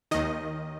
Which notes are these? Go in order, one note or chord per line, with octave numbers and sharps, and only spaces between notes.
D#2 D#3 D#5